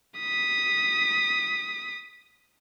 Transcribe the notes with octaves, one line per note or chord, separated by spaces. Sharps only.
D#6 B6